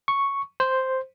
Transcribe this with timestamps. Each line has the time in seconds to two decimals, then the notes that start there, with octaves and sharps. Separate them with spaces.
0.08 C#6
0.60 C5